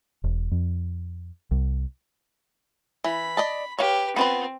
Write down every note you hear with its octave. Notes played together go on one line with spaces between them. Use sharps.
E1
F2
C2
E3 B5
D5 D#5 A5
G4 B4 C#5 F5
B3 C4 F4 B4